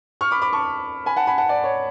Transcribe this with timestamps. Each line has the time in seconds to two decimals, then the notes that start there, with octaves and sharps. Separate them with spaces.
0.21 C#6 F6
0.31 B5 D6
0.42 B5 D6
0.53 A5 C#6
1.06 G#5 B5
1.16 F#5 A5
1.27 G#5 B5
1.38 F#5 A5
1.49 D5
1.64 C#5